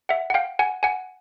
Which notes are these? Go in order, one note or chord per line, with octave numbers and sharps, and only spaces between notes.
E5 F#5
F#5
F5 G5
F#5 G#5
F#5 G#5